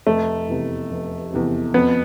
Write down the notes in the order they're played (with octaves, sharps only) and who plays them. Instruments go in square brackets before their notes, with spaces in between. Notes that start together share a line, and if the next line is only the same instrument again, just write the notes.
[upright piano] F1 [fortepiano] A3
[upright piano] E2 C3
F1
E2 C3
[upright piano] F2 [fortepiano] B3